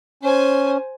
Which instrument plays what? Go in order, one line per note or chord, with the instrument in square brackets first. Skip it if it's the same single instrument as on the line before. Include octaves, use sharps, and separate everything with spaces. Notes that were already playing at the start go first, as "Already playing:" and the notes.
[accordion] C#4 [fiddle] C5 G#5